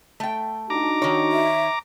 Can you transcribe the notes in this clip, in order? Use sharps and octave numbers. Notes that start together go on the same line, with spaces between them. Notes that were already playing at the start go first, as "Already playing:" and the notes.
A3 G5
D4 D#4 F#4 A#5 D6
D#3 C#5
E5